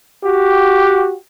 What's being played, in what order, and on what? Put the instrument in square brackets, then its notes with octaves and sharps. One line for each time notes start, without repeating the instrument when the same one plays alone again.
[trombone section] F#4 G4